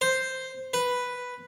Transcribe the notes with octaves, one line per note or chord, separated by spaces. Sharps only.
C5
B4